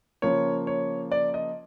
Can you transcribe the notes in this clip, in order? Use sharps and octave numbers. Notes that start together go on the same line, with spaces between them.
C#3 F3 A#3 C#5
C#5
D5
D#5